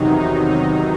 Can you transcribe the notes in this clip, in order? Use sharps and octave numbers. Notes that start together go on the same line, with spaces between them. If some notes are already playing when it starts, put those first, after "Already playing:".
Already playing: E2 C3 D#3 F#3 D#4
D#4
D#4